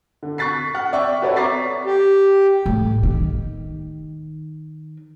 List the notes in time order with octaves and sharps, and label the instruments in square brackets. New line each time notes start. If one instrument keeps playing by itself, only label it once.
[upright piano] D3
C#6 F#6 A6 B6 C7
F#5 F6
D5 E5 G5 C#6
F#4 A4 B4 C#5 D5 E5
A#5 C#6 D6 A6 B6 C7
[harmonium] G4
[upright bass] A2
D#3